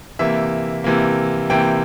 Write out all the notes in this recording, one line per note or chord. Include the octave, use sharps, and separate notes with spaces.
C3 E3 A#3 E5
C3 E3 A#3
C3 E3 A#3 G5